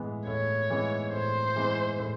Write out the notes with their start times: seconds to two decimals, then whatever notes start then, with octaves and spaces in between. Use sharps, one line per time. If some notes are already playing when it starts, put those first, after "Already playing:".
Already playing: A2 E3 G#3 B3
0.27 A2 C#5
0.70 E3 G#3 B3
1.12 A2 C5
1.56 E3 G#3 B3
2.00 A2